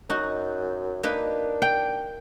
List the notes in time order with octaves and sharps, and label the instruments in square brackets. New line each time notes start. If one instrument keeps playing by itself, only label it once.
[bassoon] F#2 [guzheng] D#4 F#4
[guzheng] A#3 D#4 B4 [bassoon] D4
[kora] G5